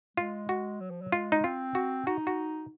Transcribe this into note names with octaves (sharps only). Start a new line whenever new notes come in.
G#3 F4
F#4
F#3
F3
F#3
G#3 F4
D#4
C4 F4
F#4
D#4 F#4
F#4